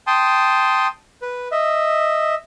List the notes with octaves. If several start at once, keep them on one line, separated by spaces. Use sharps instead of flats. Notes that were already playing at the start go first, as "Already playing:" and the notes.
G5 A5 C6 D#6
B4
D#5 E5